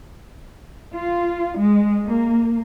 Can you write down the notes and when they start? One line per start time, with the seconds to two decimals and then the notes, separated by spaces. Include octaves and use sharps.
0.95 F4
1.60 G#3
2.06 A#3